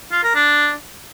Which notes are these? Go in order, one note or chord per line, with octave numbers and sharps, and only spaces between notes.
F4
A#4
D4